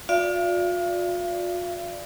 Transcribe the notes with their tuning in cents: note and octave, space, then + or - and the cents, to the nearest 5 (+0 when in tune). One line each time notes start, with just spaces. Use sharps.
F4 +40 D5 +0 F5 -40